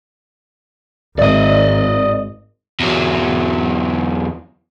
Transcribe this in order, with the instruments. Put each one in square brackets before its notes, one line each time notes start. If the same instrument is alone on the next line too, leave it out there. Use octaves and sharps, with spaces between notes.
[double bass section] G#1 [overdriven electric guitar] D5 D#5
[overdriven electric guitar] E2 F#3